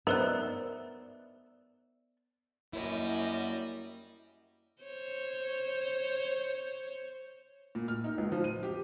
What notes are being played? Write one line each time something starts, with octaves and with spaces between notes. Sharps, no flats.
B3 D#4 A#4 C5 D5 E5 F#6
F#2 G3 A#3 E4 C#5 D#5
C5 C#5
A#2
F6
D#4
C#2
F3
D#7
G4